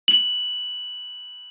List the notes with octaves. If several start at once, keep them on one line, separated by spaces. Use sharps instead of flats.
F#7